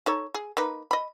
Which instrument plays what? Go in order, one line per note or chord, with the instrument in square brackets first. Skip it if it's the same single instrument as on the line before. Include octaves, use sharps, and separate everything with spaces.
[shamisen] D#4 A4 C#5
G#4
A#3 D#4 B4
D#5 B5